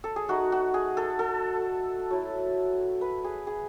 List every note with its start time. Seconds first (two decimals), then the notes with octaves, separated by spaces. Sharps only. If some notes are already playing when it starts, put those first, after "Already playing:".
0.04 A4
0.16 G#4
0.28 A3 D#4 F#4
0.52 F#4
0.74 G#4
0.97 A4
1.19 A4
2.10 F#3 A3 E4
3.01 B4
3.24 G#4
3.47 G#4